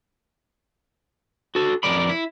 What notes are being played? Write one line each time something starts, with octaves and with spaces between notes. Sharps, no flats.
F#4 A4
F2 C#3 A#4 D5 B5
E4